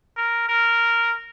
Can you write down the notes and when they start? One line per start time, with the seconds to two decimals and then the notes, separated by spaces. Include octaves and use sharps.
0.17 A#4
0.48 A#4